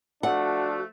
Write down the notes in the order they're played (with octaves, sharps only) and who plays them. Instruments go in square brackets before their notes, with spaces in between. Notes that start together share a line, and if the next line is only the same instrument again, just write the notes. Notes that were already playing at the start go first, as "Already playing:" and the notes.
[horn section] F3 A3 [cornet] D4 [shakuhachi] F#4 [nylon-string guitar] F#5